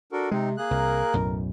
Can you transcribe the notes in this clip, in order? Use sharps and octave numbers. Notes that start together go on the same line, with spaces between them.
D4 F#4 A4 A#4
C3 G#3 C4 D#4
A#3 G#4 F#6
C2 A#4
B1 F#2 A2